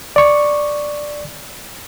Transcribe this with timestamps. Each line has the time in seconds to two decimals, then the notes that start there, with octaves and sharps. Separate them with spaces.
0.16 D5 C#6